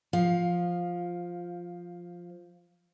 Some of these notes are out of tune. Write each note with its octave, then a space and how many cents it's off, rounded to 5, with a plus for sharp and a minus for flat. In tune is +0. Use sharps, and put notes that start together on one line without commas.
F3 +0 F5 +15